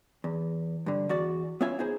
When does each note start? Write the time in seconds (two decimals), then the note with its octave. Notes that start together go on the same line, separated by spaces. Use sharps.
0.24 E2
0.86 G2 D3
1.09 E2 F#4 D5
1.61 B3 C#4 F4 E5 G#5
1.79 B3 D#4 G#4 C5